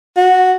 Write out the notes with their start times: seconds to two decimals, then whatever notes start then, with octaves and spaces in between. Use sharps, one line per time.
0.17 F#4